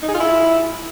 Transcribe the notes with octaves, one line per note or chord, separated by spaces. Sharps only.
D#4
G#4
F4
E4